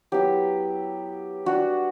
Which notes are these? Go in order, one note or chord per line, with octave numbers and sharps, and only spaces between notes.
F#3 B3 E4 G4
G3 D4 F#4